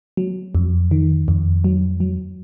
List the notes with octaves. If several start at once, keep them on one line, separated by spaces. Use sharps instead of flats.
F#3
F2
D#3
F2
F#3
F#3